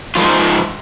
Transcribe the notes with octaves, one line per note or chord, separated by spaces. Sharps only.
G#2 F3 F4